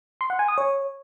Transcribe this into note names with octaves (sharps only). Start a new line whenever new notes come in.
C6
F#5
G#5
D#6
C#5